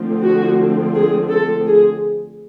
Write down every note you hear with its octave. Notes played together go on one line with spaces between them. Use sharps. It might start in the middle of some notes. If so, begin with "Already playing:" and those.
Already playing: D3 F3 A3 C4
F#4
G#4
A4
G#4